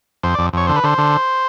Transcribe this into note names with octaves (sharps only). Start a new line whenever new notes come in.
F2 C5
F2 D5
F2 C#5
D3 C5
B4
D3 C5
D3